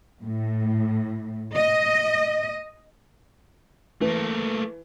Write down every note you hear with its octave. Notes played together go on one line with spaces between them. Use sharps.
A2
D#5
E3 A3 A#3